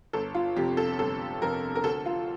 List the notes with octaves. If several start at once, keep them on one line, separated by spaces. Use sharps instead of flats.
G1 A4
F4
F2 C3 G4
A4
G1 A4
F2 C3 A#4
A#4
D2 A4
F4